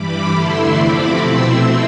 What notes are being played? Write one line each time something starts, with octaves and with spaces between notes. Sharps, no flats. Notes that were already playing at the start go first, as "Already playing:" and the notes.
Already playing: G2 E3 G3 B5 D6
E2 D3 A3 E4 C6 E6
C3 F3 A3 C4 E4 B5 D6
B2 A3 C4 E4 C6 E6